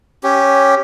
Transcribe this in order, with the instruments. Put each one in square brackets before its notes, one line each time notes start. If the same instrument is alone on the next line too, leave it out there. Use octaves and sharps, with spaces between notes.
[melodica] C#4 G4